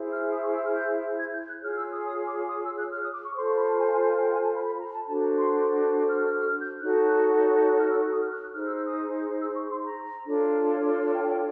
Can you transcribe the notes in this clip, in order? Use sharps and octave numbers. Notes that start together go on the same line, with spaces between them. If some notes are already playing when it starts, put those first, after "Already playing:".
Already playing: E4 G#4 C5
F6
D#6
C#6
E6
F6
G6
G#6
G6
F#6
F4 G#4 C#5 F6
E6
D#6
D#6
D6
D#6
E6
F#6
F6
D#6
D6
C#6
F4 A4 C5 C6
C#6
B5
A5
G#5
G#5
G#5
G5
G#5
A5
B5
B5
A#5
A5
D4 F#4 A4 C5 A5
A#5
C6
F6
F6
F6
G6
D#4 F#4 A4 C#5 F#6
F#6
F6
E6
C#6
D#6
F6
F#6
F#6
D#4 G#4 C5 F6
E6
E6
D#6
E6
C#6
C6
A#5
D4 F4 A4 C#5
G5
G5